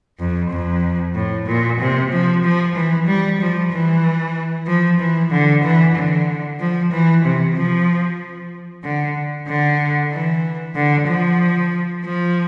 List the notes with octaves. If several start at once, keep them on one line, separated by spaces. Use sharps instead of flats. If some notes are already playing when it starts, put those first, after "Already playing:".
F2
F2
A2
A#2
C3
F3
F3
E3
G3
F3
E3
F3
E3
D3
E3
D3
F3
E3
C3
F3
D3
D3
E3
D3
F3
F3